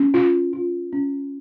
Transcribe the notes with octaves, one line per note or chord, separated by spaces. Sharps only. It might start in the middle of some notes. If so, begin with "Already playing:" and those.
Already playing: C#4
F4
F4
C#4